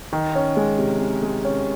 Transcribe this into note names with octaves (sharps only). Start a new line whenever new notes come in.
D#3
C#4
G#3
C3
C3
G#3
C#4